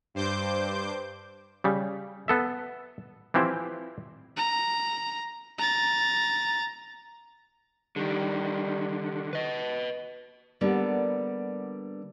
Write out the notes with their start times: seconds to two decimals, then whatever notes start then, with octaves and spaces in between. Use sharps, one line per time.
0.14 G2 C5 D6 G6
1.64 C#3 G3
2.28 B3 A4 E5
3.34 E3 F3 C4 E4 G4 C5
4.37 A#5
5.58 A#5 A6
7.96 D3 D#3 G3
9.33 B4 D#5
10.61 D3 G3 A#3 B3